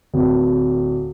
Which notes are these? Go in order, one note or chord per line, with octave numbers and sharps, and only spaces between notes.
D1